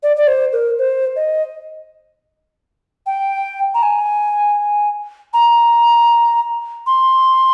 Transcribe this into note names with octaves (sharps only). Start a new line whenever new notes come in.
D5
D5
C5
A#4
C5
D#5
G5
A#5
G#5
A#5
C6